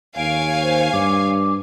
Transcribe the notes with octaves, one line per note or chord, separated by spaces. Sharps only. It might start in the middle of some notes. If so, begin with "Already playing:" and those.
D#2 C#5 F5 G#5 D7
C5
G2 D6